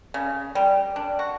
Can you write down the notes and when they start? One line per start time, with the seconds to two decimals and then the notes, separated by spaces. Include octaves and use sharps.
0.14 C#3
0.55 G3
0.96 D4
1.19 F#4